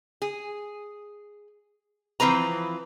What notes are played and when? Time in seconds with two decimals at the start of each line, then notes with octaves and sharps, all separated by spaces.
0.22 G#4
2.20 E3 F3 C4 B4 A#5